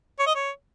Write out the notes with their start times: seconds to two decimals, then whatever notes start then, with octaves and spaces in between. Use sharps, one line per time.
0.19 C#5
0.27 D#5
0.35 C#5